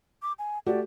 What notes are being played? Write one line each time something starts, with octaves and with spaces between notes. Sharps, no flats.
D6
G#5
A3 F#4 G4 D5